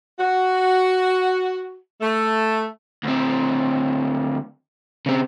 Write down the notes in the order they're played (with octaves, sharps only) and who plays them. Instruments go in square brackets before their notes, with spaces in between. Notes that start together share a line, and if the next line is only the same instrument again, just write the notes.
[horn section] F#4
A3
[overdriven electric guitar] D2 C4
C#3 C4